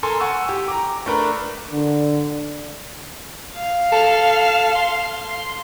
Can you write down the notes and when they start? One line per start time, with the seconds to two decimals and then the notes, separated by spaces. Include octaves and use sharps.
0.03 A4 A#4 G#5 C6
0.20 F#5 G#5 C#6 E6
0.49 G4
0.68 A#5 D6
1.06 A3 D4 A#4 B4
1.73 D3
3.57 F5
3.92 A4
4.75 C6